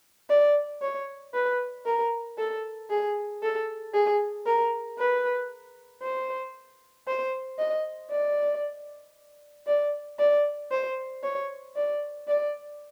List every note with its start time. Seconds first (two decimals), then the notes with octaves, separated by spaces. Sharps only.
0.29 D5
0.82 C#5
1.34 B4
1.86 A#4
2.38 A4
2.90 G#4
3.43 A4
3.94 G#4
4.46 A#4
4.99 B4
6.02 C5
7.07 C5
7.59 D#5
8.10 D5
9.67 D5
10.19 D5
10.71 C5
11.23 C#5
11.75 D5
12.27 D5